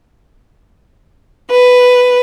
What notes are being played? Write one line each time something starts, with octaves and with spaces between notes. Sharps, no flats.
B4